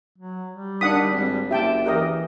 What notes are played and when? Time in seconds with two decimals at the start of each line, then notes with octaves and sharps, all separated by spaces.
0.18 F#3
0.51 G3
0.81 D#3 D4 F#5 D#6 B6
1.12 G#1
1.51 F#1 G4 E5 G5 A5
1.86 E3 G4 A#4 D#5